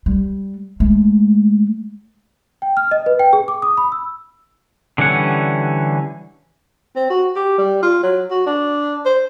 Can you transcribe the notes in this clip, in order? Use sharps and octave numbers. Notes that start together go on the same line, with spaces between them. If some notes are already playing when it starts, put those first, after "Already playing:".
G3
G#3 A3
G5
F6
D#5
B4
G5
G#4
D6
D#6
B5
E6
D3 E3 G3 C#4 F#5
C4
F#4
G4
G3
F4
F#3
F#4
D4
C5